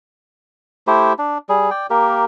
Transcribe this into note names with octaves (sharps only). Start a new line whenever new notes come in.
A3 E4 G4 C5
D4
G3 G#4
D5 G5
A#3 G4 A#4